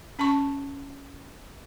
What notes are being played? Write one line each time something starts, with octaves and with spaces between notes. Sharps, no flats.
C#4 A5 B5 C#6